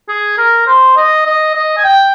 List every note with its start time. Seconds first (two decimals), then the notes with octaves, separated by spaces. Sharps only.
0.09 G#4
0.38 A#4
0.67 C5
0.97 D#5
1.26 D#5
1.55 D#5
1.77 G#5
1.84 G5